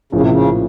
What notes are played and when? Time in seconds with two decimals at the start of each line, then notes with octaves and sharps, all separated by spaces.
0.12 A#1 A2 C#3 F3 A#3 C#4
0.21 C3
0.30 C#3